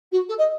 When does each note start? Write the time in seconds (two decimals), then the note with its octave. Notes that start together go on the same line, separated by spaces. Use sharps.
0.11 F#4
0.28 A4
0.38 D#5